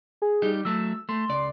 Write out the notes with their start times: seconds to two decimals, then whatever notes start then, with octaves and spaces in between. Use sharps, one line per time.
0.22 G#4
0.42 G3 D#4 G4
0.65 F#3 A3 E6
1.09 A3 C6
1.29 C#2 D5